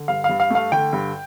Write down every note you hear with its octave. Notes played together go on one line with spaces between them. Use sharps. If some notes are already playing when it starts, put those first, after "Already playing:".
Already playing: D3
G2 F5
G2 F5
F5
A3 F5
D3 G5
G2